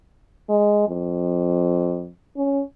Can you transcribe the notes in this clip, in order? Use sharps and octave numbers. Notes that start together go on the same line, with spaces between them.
G#3
F2
C#4